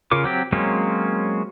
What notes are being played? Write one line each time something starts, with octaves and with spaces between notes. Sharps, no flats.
C#3 C#4 F4 A#4 D6
F#3 C4 G4
F#3 G#3 A#3 C4 C#4